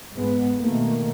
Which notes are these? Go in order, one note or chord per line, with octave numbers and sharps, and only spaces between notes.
G#2 G#3 B3
B2 D#3 A3 A#3